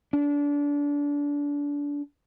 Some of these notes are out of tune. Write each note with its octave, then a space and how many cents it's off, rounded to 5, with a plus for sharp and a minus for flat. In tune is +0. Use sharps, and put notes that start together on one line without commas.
D4 -25